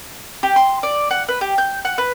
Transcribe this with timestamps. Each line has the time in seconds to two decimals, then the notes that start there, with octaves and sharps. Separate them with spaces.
0.43 G4
0.56 C6
0.83 D5
1.11 F#5
1.29 B4
1.41 G4
1.58 G6
1.85 F#5
1.98 B4